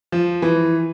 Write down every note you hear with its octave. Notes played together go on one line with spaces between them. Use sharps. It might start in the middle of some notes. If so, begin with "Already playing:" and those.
F3
E3